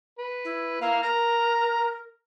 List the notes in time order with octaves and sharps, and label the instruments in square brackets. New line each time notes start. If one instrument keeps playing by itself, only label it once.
[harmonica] B4
[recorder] E4
[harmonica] A#3 F5 [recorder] E4
[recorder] A#4 [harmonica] A#5